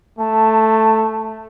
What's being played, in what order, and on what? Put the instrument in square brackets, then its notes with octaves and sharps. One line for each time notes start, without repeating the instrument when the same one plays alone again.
[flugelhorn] A3 [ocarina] A5